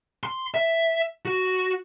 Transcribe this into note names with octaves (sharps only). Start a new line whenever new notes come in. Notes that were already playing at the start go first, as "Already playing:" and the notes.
C6
E5
F#4